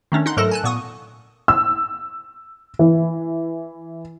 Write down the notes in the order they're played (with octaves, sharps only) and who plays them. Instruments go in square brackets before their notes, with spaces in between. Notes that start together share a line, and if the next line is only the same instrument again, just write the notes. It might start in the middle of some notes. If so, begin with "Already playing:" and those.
[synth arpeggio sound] D#3 A3 C#4 D4
D#4 F#5 C6 F#6
G#2 F#3 A3 A4 A#4 A#6
G#5 A5 F#6
A#2 B3 C#6 D#6 D#7
[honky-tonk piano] E6
E3